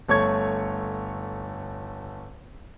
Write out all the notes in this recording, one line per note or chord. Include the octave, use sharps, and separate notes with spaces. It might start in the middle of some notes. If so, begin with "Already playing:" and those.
G1 A3 C#5 C#6 G#6